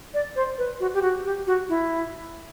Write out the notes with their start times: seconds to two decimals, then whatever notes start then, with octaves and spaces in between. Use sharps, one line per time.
0.14 D5
0.36 C5
0.58 B4
0.80 F#4
0.94 G4
1.02 F#4
1.25 G4
1.47 F#4
1.69 E4